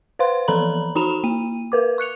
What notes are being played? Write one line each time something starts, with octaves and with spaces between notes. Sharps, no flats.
B4 C5 F5 C6
E3 F3 A4 A#5 B5 F#7
D#4 F#4 A#5 B5 E7 F7
A#3 D#7
A#4 B4 D6
C#6 F#6 C#7 F7